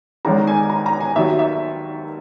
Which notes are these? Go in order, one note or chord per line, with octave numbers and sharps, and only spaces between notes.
G#1 G#2 D#3 G#3 C#4 A#5
G#5
A#5
A#5
G#5
D#2 D#3 F#3 E5
E5